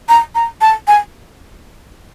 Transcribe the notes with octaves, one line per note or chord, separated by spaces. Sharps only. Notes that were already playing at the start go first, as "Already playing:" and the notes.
A#5
A#5
A5
G#5